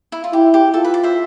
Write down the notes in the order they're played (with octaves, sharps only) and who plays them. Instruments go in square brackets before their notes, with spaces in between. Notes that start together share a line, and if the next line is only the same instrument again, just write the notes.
[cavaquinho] E4
F4
[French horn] E4 [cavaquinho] G4
[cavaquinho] G4
[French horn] F4 [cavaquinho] A4
[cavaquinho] B4
D5
C5 E5